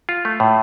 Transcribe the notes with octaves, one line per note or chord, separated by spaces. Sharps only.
F4
A3
A2